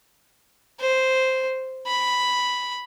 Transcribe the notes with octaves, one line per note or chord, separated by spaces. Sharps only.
C5
B5